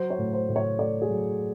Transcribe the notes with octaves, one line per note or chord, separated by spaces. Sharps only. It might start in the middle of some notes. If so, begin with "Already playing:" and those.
Already playing: F#3 C5
C#5
A2
C5
A2
C#5
A3 D5
G#4
F#3